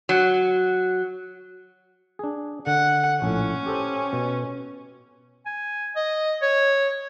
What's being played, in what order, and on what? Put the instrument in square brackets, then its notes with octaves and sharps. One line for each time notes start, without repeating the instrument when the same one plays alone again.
[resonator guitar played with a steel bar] F#3
[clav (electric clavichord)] D4 G#4
[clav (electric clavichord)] D3 [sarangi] F#5
[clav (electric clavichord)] A#1 A2 [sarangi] C#4
[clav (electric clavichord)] G4 A4 C5
B2
[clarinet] G#5
D#5
C#5